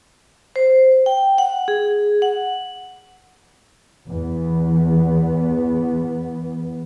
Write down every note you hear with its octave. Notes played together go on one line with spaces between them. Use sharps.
C5
G5
F#5
G#4
F#5
E2 B3